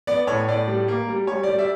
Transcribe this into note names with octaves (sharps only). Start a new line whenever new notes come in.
B3 D5
A2 C#5
A2 D5
G3
A#3
G3
G3 C#5
D5
G3
D5 E5